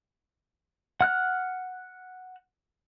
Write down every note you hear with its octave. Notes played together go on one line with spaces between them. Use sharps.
F#5 F6 F#6